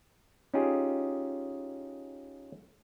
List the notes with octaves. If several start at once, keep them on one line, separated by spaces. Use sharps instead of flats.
C#4 D#4 F4 G4 G#4